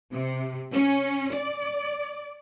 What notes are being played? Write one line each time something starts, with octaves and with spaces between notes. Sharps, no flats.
C3
C#4
D5